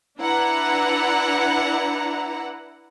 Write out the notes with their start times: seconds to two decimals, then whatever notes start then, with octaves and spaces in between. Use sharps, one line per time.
0.19 D4 E4 B4 F#5 A#5